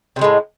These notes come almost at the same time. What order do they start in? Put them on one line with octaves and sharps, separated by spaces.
C3 F#3 G#3 A2